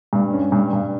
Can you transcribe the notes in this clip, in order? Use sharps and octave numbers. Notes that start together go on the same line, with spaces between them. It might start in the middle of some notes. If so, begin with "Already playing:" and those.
G2
C#4
G2
G2